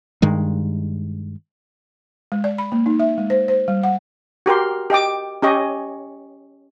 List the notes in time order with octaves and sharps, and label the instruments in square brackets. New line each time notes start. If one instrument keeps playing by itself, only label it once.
[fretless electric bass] G2 D#3 G#3
[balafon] G#3
D5
B5
A#3
D#4
E5
G#3
C5
C5
G3
F#5
[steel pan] F#4 G4 A#4 C6
G4 D#5 G5 D6
C#4 G4 D#5 C#6